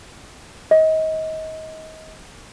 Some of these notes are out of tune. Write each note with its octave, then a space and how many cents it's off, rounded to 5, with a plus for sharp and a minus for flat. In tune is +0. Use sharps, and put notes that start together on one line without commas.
D#5 +30